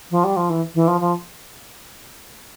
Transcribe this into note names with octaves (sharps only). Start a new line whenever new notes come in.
F3
G3
F3
E3
E3
F3
F3